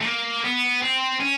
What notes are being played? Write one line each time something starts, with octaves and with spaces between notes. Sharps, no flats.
A3
A#3
B3
C4
C#4